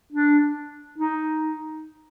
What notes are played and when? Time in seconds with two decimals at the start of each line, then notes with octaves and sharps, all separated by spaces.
0.12 D4
0.98 D#4